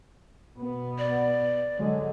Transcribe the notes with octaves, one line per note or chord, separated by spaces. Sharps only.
B2 B3
D5
D3 F#3 G#3